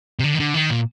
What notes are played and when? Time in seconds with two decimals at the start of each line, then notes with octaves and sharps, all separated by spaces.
0.19 C3
0.24 D3
0.34 D#3
0.39 D3
0.54 D#3
0.70 A#2